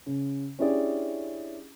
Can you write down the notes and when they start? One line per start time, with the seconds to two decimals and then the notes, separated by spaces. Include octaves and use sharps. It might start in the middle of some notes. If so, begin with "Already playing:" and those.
0.06 C#3
0.59 C#4 D4 E4 G4 G#4 D5